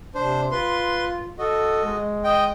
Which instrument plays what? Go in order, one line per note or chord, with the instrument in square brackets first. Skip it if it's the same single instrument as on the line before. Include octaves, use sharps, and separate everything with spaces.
[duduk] C3 [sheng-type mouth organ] D4 C5
[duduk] F4 [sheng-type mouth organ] B4 C6
[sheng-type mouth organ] F#4 D#5 [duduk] A4
[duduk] G#3
[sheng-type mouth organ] D#5 G5